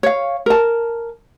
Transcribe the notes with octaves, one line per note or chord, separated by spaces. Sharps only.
C#5 F5
A#4 A5